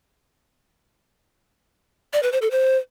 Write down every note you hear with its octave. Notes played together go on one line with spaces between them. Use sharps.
D5
B4
C5
A4
C5